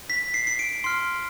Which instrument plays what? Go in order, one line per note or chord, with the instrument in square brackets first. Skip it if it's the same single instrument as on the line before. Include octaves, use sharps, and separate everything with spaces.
[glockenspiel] B6
C7
C7
D7
C6 F6 C7